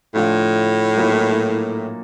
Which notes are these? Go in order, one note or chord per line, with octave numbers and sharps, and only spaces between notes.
A2 D3 F3 A3 D4 F4
A#2 F#3 A#3 D#4